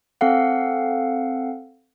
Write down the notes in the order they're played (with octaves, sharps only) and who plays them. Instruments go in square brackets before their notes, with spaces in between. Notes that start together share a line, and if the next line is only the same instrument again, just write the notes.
[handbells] C4 A4 F5 F#5